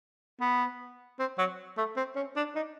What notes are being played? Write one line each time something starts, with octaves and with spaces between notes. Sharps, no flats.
B3
C4
F#3
A3
C4
C#4
D4
D#4